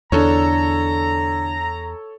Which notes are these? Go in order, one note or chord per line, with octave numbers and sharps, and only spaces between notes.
E2 D3 D4 A4 C#5 A#5